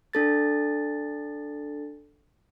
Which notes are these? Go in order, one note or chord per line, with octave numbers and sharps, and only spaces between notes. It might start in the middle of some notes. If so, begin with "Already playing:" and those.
D4 A4 A6